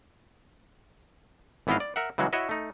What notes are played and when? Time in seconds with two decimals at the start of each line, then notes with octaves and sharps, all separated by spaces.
1.67 G#1 E3 B3 E4 D#5 F5
1.80 D5
1.96 A#4 E5 F#5
2.18 C#3 E3 F#3 G#3 F#4
2.33 E4 F#4 C#5 D#5 E5
2.49 A3 D#4